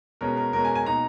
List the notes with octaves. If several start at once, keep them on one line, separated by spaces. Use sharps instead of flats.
B2 G#3 C#4 A#4
A#4
B2 G#3 C#4 A#4
G#5
G#5
B2 A#3 D#4 A#5